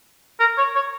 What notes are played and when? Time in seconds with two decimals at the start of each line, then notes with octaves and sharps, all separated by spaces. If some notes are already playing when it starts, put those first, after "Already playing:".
0.40 A#4
0.58 C#5
0.75 C#5